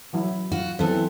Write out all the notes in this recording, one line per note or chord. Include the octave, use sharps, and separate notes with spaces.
E3 F#3 E4
F4 F#4
E3 F#3 B3 C4 A4